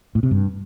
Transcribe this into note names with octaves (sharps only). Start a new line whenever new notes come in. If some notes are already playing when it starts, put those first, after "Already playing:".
A2
C3
G2